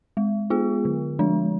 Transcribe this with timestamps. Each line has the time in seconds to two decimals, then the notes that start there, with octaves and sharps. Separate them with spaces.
0.17 G#3
0.50 B3 F4 G#4
0.85 D3
1.19 F3 G#3 D4